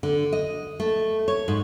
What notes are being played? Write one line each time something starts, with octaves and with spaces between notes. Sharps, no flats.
D3
D#5
A3
C#5
G#2